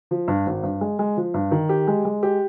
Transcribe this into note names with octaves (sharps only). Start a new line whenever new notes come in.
F3
G2
G#1
G2
G#3
G#3
F3
G2
D#3
G4
G#3
G#3
G4